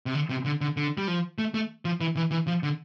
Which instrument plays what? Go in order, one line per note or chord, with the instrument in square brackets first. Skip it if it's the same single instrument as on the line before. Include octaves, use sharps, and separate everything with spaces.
[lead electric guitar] C3
D3
C3
D3
D3
D3
G3
F3
A3
A3
F3
E3
E3
E3
F3
D3